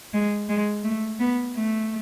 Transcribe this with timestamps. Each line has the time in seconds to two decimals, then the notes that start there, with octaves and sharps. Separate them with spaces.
0.13 G#3
0.49 G#3
0.83 A3
1.19 B3
1.55 A3